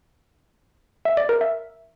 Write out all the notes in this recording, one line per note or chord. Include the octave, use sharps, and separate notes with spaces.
E5
D5
A#4
E5